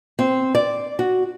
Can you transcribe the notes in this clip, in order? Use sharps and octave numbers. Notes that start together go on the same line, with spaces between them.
C4
D5
F#4